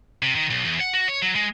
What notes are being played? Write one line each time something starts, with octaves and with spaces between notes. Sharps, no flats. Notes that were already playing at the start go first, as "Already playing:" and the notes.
C3
D#3
B1
E2
F#5
F#4
C#5
F#3
G#3